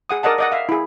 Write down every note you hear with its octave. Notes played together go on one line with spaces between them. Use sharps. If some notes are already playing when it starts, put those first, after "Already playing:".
G#4 F#5 D#6
A#4 D5 D#5 F#5 A5
D5 D#5 F#5
E5 F5
E4 G#4